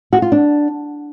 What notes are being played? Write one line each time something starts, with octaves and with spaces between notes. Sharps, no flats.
F#4
F4
D4